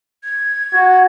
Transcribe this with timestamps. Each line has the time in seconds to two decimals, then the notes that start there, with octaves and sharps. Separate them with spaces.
0.24 G#6
0.74 F#4